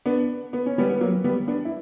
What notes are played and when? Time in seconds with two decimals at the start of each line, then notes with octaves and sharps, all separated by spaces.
0.06 B3 D4
0.53 B3
0.66 C#4
0.78 G3 B3
0.90 B3
1.00 F#3 A#3
1.24 G3 B3
1.47 B3 D4
1.65 E4